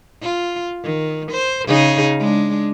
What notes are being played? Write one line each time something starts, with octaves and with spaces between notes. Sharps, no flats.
F4
D#3
C5
C#3 D#4 G#4
G#3 D4